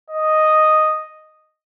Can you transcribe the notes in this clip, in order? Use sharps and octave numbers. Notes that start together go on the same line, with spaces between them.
D#5